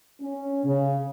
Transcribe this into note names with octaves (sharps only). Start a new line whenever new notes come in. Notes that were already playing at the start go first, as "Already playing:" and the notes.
C#4
C#3